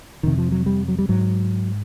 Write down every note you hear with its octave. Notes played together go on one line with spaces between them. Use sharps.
F2 C3 D#3
F3
F#3
G3
F#3
G3
G#2 F#3